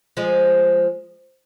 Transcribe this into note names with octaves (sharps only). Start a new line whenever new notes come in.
F3 G#3